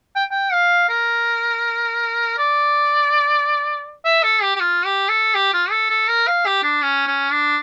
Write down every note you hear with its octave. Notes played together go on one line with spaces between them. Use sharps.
G5
G5
F5
A#4
D5
E5
A4
G4
G4
F4
G4
A4
G4
F4
A4
A4
A#4
F5
G4
D4
C#4
C#4
D4